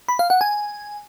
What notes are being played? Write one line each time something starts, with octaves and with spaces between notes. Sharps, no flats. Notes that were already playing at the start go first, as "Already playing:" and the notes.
B5
F5
F#5
G#5